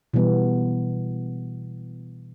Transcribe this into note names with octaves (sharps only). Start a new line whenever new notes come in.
B2 E3 G3 B3